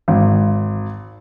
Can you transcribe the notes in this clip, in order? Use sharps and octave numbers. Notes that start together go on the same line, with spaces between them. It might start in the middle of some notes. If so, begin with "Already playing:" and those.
G#1